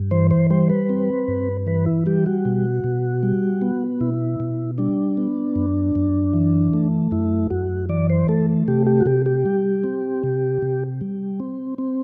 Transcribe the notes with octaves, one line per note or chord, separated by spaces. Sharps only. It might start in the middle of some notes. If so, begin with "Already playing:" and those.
Already playing: G2
E3 C5
C5
G3 C5
B4
C4
G2
E3 B4
E4
G3 G4
F#4
B2
B2
G3
B3
B2 E4
B2
G3 D4
B3
F#2
F#2
E3
A3
F#2 E4
F#2 F#4
E3 D5
C5
A3 A4
C3 G4
G4
F#4
C3 G4
G4
G3
C4
C3
C3
G3
C4
C4